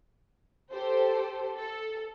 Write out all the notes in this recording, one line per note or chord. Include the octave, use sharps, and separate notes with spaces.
G4 A4 C5
A4